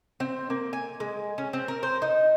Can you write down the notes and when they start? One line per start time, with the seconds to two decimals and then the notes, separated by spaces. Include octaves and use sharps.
0.20 C4
0.50 A#3
0.73 G#5
1.00 G#3
1.38 C#4
1.53 C4
1.68 A#4
1.83 C5
2.02 D#4